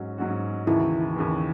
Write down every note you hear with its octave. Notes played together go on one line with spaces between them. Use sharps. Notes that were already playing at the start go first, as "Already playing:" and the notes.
Already playing: G#2 F#3 C#4 F#4
G#2 F#3 C#4 F#4
D#2 C#3 E3 E4
D#2 C#3 E3